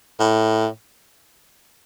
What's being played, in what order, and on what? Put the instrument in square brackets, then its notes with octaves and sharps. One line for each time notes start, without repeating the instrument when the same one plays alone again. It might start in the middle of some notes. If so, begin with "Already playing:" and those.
[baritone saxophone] A2